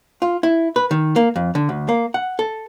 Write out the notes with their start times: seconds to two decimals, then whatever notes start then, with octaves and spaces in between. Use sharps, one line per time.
0.22 F4
0.43 E4
0.76 B4
0.91 D#3
1.16 A#3
1.36 F2
1.55 D3
1.69 D2
1.89 A#3
2.14 F#5
2.39 A4